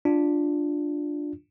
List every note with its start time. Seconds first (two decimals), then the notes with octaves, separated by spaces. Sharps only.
0.05 D4 F4